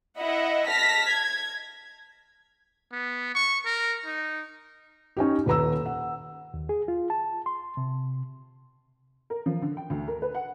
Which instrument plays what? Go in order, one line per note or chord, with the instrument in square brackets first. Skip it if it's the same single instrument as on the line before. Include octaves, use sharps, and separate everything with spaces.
[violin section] E4 D#5 E5 F#5
A5 F6 A#6 B6
G#6
[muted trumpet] B3
C#6
A#4
D#4
[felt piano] C#4 D#4 G4
D#1 B4 A#5 E6
F#5
[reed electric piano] D#2
G#4
F4
A5
C6
C3
[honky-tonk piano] A#4
F3
D3
G5
D2
A#4
B4
F#5